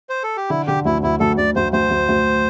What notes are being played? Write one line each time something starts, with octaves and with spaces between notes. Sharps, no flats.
C5
A4
G4
D3 E4
D3 G4
D2 E4
D2 E4
D2 A4
D2 D5
D2 C5
D2 C5
D2
D2